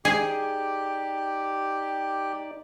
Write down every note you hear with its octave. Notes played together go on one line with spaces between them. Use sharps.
D#4 G4 G#4 D5